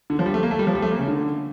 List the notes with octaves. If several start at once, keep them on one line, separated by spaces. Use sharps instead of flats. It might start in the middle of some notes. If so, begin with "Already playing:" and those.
D3
F3
G3
A3
A#3
A3
G3
F3
G3
A3
A#3
C#3
D3